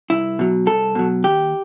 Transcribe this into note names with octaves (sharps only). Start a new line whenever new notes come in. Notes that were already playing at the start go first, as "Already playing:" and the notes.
C2 E4
B2 F#3
C2 A4
B2 F#3
D#2 G4